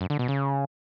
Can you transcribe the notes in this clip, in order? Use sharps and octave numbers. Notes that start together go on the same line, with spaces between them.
F#2
D3
B2
C#3